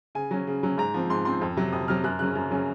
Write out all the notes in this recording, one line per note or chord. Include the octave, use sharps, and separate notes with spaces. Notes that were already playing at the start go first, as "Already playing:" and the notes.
C#3 G#5
F#3 C#4
C#3
F#3 C#4
G#2 A#5
F3 C4
G#2 C6
F3 C4 C6
F2
C3 F#3
F2 D#6
C3 F#3 F6
F#2 F#6
C#3 F#3 C#4 F#6
F#2
C#3 F#3 C#4